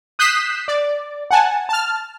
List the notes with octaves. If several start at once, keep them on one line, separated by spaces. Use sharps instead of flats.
D#6 F#6 G6 B6 C7 E7
D5
F#5 G#5 A5
A5 F6